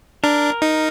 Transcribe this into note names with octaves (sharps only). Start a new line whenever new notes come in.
D4 A#4
D#4